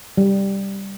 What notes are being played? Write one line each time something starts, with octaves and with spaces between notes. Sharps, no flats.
G3